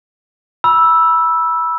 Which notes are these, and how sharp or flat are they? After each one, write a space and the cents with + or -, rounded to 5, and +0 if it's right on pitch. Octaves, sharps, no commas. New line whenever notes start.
B5 -25 E6 +0